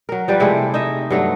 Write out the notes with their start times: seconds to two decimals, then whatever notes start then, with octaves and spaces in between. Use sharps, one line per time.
0.09 F#3 A#4
0.28 F3 G3 B4 D5
0.40 C3 G#3 A3 E4
0.74 D#4 D#5 E5
1.10 G2 F#3 A3